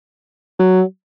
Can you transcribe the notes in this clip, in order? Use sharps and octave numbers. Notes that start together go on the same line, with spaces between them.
F#3